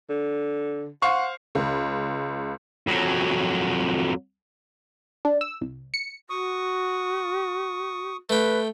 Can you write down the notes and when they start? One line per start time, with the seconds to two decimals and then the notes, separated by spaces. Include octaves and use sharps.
0.09 D3
1.02 C5 F5 F#5 C#6
1.55 C#2
2.87 F2 F#3
5.25 D4
5.41 E6
5.61 C2
5.94 C#7
6.30 F#4 C#6 D#6
8.30 A3 B4 G5